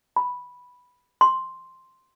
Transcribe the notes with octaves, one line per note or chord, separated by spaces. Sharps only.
B5
C6